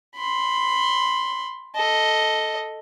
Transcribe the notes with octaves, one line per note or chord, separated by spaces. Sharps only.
B5 C6
A4 D#5